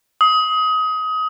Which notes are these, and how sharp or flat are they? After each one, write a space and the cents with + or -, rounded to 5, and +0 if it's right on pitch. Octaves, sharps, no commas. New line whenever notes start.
D#6 +25